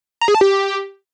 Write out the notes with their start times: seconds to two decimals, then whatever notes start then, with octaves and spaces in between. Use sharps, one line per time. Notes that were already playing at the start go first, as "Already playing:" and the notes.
0.21 A#5
0.28 G#4
0.35 A5
0.41 G4